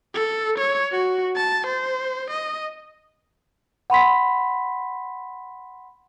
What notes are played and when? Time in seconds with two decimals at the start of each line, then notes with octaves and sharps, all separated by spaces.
0.14 A4
0.58 C#5
0.92 F#4
1.36 A5
1.66 C5
2.30 D#5
3.90 F#5 B5 C6 B6